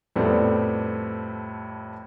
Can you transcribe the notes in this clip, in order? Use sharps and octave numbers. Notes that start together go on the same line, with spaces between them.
F2 A2 G3 A3 B3 C4